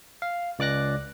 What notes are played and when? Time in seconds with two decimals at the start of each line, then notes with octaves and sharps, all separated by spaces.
0.22 F5
0.59 C#2 D5 D6 F#6 A#6